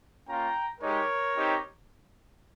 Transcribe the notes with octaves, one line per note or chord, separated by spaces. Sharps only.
A#3 C#4 F4 G5 A#5
G#3 D#4 G4 A#4 C#5
C4 D#4 G4